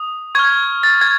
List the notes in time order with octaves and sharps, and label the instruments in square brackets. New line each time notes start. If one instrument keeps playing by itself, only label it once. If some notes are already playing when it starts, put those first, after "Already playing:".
Already playing: [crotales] D#6
C#6 F6 G#6
A6
G#6